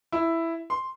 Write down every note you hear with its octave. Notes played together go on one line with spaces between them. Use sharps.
E4
C6